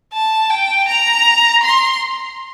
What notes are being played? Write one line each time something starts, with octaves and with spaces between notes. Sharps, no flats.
A5
G5
A#5
C6